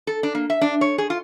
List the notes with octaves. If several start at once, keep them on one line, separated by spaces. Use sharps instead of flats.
A4
D4
A#3
E5
D4
C#5
G#4
F4